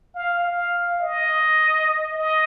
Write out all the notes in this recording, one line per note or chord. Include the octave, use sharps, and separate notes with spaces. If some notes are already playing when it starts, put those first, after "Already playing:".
F5
F5
D#5
D#5